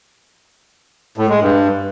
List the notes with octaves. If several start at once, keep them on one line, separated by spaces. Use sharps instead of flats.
A2
G#3
G2